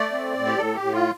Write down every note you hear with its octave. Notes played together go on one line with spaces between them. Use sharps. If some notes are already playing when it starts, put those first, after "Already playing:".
Already playing: A3 D5
C4
A2
G4
A2 A4
G4
A2
F4